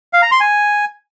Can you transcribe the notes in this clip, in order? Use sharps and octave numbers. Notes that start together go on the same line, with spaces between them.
F5
A#5
C6
G#5